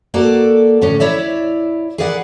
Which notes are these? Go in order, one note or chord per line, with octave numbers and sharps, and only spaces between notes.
A#3 F#4 A4 D5
A2 D3 C#4
E4 C#5 D5 E5
G#4 A#4 B4 D5 E5 F#5